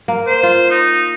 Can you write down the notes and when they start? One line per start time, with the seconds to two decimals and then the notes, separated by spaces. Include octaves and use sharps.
0.08 A#3
0.27 C5
0.43 F4
0.70 D#4